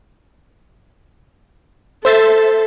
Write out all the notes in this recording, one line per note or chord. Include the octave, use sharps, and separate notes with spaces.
A4 C5 E5 A6